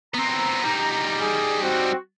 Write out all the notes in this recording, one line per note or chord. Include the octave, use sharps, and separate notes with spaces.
B3 C4 A#5
G3 D#4
G#4
C4 F#4